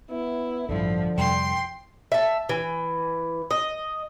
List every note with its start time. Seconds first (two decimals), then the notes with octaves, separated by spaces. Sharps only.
0.11 B3 E4
0.69 A1 G2 D3 F3
1.18 F2 C3 G3 G5 C6
2.12 E5 A5
2.49 E3
3.51 D#5